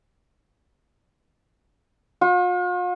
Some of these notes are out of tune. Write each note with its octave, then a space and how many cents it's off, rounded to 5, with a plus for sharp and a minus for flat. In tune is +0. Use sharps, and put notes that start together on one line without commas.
F4 +45